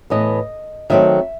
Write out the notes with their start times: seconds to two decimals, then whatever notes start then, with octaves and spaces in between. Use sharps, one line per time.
0.10 A2 E3 B3 D#5
0.90 D#3 F#3 A3 C4 E5